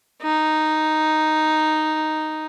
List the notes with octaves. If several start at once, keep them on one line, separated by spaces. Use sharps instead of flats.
D#4